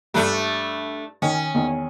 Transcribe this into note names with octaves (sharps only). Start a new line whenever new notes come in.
G2 A3 D4
D#3 C#4
E2 D#3